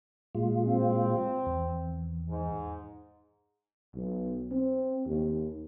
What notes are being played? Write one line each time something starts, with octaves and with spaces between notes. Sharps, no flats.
A#2 G#3 F4
C4
E2
G#2
B1
C4
D#2